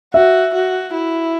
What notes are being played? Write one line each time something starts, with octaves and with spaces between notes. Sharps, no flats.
F#4 E5
F#4
E4